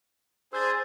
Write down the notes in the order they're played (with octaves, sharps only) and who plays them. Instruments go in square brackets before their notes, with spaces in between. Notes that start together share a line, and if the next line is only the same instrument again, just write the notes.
[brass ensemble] D4 G#4 [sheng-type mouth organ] C5 [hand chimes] E6 G6 A6